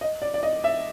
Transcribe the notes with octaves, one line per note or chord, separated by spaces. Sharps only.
D#5
D5
D5
D#5
E5